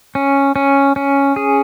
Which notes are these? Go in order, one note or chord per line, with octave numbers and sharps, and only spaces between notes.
C#4
C#4
C#4
G#4